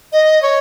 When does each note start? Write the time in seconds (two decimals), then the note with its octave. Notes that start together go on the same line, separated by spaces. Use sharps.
0.12 D#5
0.42 C#5